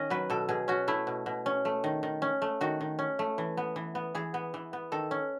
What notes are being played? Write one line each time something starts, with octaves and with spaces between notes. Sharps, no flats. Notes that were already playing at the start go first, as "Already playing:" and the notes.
Already playing: D#3 C#4 D#5
F#3 B4
B2 A4
B2 G#4
C#4 F#4
A3 E4
B2
B2
C#4
A3
D#3
D#3
C#4
A3
D#3 F#4
D#3
C#4
A3
E3
B3
E3
B3
E3 G#4
B3
E3
B3
D#3 A4
C#4